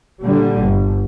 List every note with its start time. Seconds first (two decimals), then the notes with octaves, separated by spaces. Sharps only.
0.24 A#2 D3 G3
0.62 G1